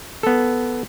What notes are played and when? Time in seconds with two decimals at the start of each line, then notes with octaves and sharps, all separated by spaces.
0.23 B3 A4